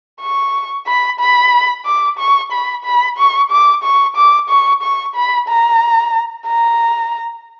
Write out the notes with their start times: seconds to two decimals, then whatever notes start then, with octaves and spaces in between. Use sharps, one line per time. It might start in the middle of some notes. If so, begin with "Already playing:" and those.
0.21 C#6
0.87 B5
1.20 B5
1.86 D6
2.19 C#6
2.52 B5
2.85 B5
3.18 C#6
3.51 D6
3.83 C#6
4.16 D6
4.49 C#6
4.83 C#6
5.15 B5
5.49 A#5
6.47 A#5